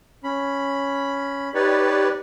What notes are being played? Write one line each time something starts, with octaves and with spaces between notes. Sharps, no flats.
C#4 B5
D#4 G4 B4 C#5 D5